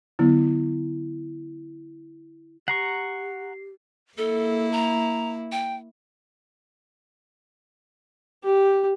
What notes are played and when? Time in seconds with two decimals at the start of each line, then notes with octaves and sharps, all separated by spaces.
0.19 D3 F#3 B3 E4
2.68 G4 F#5 A#5 C#6 C7
4.18 A#3 E4 A4
4.72 A#5
5.52 G5
8.44 G4